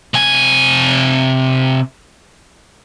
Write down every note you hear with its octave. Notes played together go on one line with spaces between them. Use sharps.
C3 G#5